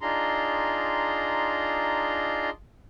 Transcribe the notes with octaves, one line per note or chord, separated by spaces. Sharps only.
D4 D#4 F4 G#4 A#5 C6